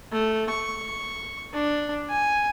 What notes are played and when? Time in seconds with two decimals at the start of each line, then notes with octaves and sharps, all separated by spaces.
0.12 A3
0.49 C#6
1.53 D4
2.10 G#5